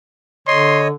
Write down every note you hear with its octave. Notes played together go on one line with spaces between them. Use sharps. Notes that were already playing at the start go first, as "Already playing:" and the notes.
D3 C#5 D#5 C6